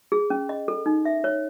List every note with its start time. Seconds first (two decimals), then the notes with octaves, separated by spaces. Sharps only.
0.12 G#4
0.30 C#4
0.49 D#5
0.68 A4
0.86 D#4
1.05 E5
1.24 C#5